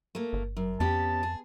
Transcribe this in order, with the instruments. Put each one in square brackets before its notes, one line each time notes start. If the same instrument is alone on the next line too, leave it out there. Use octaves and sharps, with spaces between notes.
[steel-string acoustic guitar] A3 A#3
[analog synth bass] G1
[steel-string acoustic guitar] F#2
[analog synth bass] F2 [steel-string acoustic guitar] B3 C#4 G4 [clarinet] A5
[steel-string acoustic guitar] G#4